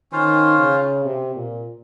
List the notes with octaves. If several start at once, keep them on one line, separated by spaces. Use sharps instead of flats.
D#3 C#4 F4 C5 F5
C#3
C3
A#2